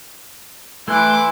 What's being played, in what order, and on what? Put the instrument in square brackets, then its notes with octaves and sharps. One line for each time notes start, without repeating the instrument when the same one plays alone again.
[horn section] E3 E4 [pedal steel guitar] A3 F#6 [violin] C6 D6